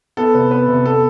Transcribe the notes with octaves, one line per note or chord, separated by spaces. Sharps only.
B3 A4
C3 B4
B3 B4
C3
B3 A4